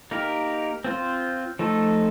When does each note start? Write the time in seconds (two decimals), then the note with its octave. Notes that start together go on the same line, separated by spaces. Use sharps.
0.11 A#3 D#4 G4 A#4
0.84 C4 F4 C5
1.59 F3 A3 D#4 A4